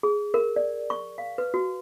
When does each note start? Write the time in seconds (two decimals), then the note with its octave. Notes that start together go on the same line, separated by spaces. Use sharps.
0.03 G#4
0.34 A#4
0.56 D5
0.90 C#6
1.18 F5
1.38 B4
1.54 F#4